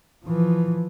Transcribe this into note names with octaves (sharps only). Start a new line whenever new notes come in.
E3 F3